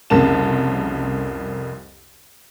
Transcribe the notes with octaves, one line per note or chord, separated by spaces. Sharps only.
C2 F2 C#3 A#3 A5 E7